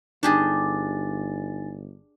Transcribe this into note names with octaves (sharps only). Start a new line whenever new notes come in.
G1 D4 D#4 G4 G#4 G#5 A6